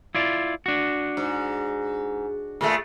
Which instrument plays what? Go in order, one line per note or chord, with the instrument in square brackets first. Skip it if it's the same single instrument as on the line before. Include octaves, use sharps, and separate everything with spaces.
[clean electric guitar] E4 F4 D5
D4 F#4
[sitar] G#2
A#2 G#3 A3